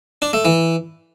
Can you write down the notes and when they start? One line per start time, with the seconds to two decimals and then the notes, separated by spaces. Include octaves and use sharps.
0.22 D4
0.33 A3
0.45 E3